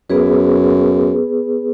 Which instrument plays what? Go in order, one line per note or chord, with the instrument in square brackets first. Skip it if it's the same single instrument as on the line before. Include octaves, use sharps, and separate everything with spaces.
[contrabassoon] F#2 [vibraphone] B3 G#4 B4